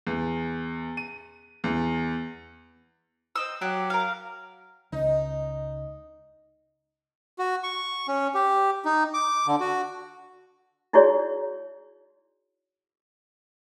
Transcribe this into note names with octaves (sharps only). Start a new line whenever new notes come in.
E2
D#7
E2
C4 D#5 E6
F#3 G4
A#4 F5
C#2 D#4
F#4
C#6
C#4
G4
D#4
D6
D3
F#4
D#4 E4 F#4 G#4 C#5 D5